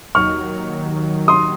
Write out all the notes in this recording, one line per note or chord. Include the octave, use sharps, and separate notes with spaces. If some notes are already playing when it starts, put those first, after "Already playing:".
D#2 D#3 F#3 C#6 F6
C6 D#6